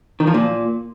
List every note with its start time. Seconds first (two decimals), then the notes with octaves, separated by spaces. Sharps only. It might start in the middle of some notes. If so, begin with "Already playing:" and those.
0.20 D#3
0.27 F3
0.34 A#2